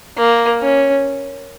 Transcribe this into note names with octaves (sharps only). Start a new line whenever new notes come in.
A#3
C#4